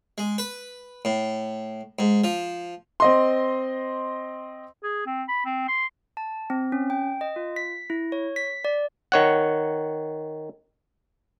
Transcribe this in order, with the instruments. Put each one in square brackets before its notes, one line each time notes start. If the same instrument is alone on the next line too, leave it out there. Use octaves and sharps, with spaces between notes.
[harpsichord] G#3
B4
A2
G#2
F3
[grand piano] C4 D#5 C6
[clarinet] G#4
C4
B5
C4
C6
[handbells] A5
C4
C#4
G5
D#5
F4
B6
E4
C#5
B6
D5
[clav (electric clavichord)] D#3 C#5 F#5